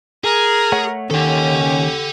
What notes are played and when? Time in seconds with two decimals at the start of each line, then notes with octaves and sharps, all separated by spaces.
0.24 G#4 A#4
0.72 A3 C#5 F#5
1.11 D#2 D#3 C#4 G4 A4 F#5